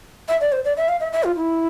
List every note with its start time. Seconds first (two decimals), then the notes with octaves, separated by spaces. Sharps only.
0.28 E5
0.41 D5
0.52 C5
0.65 D5
0.77 E5
0.88 F5
1.00 E5
1.13 E5
1.24 F4
1.36 E4